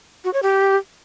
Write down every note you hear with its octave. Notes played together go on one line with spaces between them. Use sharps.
F#4
C#5
G4